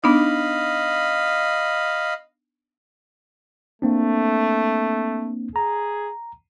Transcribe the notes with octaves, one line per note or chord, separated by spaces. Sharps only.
B3 D4 D#4 D#5 F5 B5
A3 A#3 C4 D4
G#4 A#5